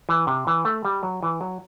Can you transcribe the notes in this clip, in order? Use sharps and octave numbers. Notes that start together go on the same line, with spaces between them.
E3
C3
E3
A3
G3
F#3
E3
F#3